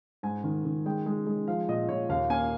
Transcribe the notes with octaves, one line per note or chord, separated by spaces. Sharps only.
G#2 G#5
D#3
D#3
G#3 G5
G#3
G#3
F3 F5
A#2 D#5
A#2 C#5
D#2 F5
A#3 G#5